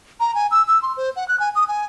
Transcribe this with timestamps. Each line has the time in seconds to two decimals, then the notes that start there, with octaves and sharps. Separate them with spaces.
0.20 A#5
0.35 G#5
0.51 E6
0.68 E6
0.82 C6
0.97 C5
1.16 F#5
1.28 F#6
1.40 G#5
1.55 D#6
1.68 G#5